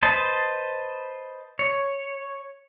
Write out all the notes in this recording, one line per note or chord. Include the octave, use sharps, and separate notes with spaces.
B4 C5 D#5 A5
C#5